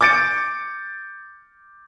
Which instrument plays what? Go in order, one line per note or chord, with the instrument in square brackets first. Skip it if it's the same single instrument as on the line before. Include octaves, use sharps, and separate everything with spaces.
[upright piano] D6 G6 A6 C#7 D7